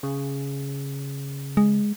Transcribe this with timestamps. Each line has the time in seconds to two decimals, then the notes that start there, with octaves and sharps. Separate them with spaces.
0.03 C#3
1.57 G#3